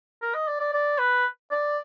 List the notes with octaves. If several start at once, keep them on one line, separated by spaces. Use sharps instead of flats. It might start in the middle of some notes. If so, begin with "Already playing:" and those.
A#4
D#5
D5
D5
D5
B4
D5